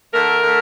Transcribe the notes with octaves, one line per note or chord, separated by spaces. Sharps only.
D3 A3 A#4
D3 A3